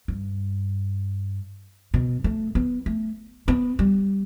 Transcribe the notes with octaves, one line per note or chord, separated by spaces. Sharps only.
G2
B2
A3
B3
A3
B3
G3